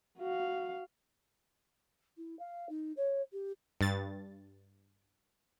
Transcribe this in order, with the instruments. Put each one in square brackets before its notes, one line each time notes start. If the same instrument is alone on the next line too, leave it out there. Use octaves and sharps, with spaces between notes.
[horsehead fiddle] F#4 F5
[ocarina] E4
F5
D#4
C#5
G4
[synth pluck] G2 A6